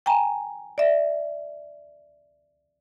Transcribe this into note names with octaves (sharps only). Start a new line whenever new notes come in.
G5 G#5 A#5
D5 E5